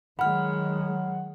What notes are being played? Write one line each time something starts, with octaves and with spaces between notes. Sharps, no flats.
D#3 F#3 G#3 F#5 B5 F6